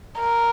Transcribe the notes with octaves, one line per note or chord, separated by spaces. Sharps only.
A#4